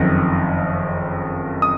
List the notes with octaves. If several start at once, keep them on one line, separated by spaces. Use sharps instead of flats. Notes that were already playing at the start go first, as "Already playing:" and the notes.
Already playing: F#1 F2 D#3
D#6